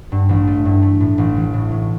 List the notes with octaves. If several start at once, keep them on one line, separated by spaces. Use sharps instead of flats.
G2
A1
A3
G2
A3
A2
A1
E3
A2
A2